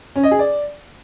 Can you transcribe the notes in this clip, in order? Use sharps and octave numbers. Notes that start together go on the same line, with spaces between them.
C#4
D#5
G#4
D5